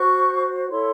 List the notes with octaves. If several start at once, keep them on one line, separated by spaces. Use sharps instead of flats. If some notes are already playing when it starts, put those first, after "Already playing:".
Already playing: F#4 C5 C#6
E4 A4 C#5 C6